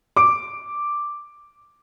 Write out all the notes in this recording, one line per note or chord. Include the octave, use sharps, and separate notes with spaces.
D6 D7